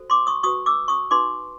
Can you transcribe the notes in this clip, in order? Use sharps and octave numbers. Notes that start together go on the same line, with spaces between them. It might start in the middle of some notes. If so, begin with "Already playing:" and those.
Already playing: F#4 A4 C5
C6 D6
C#6 D#6
F#4 B4 C#6 D#6
D6 E6
C#6 D#6
D#4 F#4 B4 C6 D6